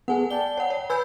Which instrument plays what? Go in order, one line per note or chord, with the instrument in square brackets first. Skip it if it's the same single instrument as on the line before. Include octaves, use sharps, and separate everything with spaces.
[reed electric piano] B3 G#4 A4 [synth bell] F#5 G#5
[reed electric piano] D5 G5 A5 [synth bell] G7
[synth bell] C#5 F#5
C#5
[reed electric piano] B4 G#5 [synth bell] B5 E6 G6